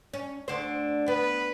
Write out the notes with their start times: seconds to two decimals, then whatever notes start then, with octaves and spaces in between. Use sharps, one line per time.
0.13 C#4
0.48 D2 D3 C5
1.08 B3 B4